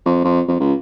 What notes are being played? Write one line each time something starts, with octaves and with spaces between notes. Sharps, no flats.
F2
F2
F2
C#2